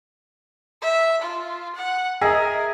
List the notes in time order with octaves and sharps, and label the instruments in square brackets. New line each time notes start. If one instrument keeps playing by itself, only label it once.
[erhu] E5
F4
F#5
[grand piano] G#4 [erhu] A#4 [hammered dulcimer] D#5 E5